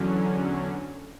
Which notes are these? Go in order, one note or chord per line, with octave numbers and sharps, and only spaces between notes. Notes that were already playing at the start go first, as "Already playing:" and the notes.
Already playing: E2 D3 F#3 C#4